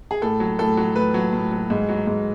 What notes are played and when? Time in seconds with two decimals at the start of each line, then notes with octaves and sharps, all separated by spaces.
0.11 G#4
0.22 A2 A4
0.40 F#3
0.59 A2 A4
0.77 F#3
0.96 A2 B4
1.14 F#3
1.33 A2
1.52 F#3
1.70 G#2
1.89 F#3
2.07 G#2